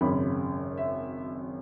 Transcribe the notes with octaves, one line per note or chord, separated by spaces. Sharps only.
G#1 F#2 C#3 B5
E5